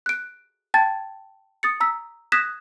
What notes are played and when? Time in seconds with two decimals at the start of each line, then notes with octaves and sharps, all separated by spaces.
0.06 F#6 D7
0.74 G5 A5 G#6 A6
1.63 D#6 A6 C#7
1.80 A#5 E6 B6
2.32 D#6 F#6 G#6 A#6 B6 E7